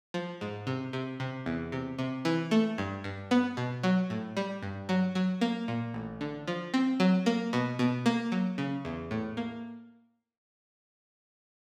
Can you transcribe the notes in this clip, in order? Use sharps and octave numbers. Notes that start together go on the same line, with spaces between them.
F3
G#2
C3
C3
C3
E2
C3
C3
E3
A3
G2
G2
B3
B2
F#3
A2
G3
G2
F#3
F#3
A#3
A#2
A1
D3
F3
C4
F#3
A#3
B2
B2
A#3
F#3
C#3
E2
A2
A#3